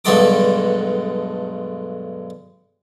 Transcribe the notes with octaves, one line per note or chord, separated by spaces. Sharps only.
B1 G2 D3 G#3 A4 D6